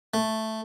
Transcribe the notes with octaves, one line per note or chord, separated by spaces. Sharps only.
A3